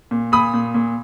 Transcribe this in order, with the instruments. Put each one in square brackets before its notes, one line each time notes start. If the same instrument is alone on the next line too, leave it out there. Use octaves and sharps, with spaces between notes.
[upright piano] A#2
A#2 B5 D#6
A#2
A#2